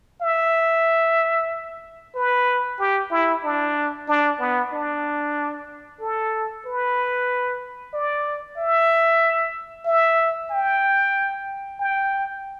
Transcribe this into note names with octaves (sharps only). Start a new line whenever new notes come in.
E5
B4
G4
E4
D4
D4
B3
D4
A4
B4
D5
E5
E5
G5
G5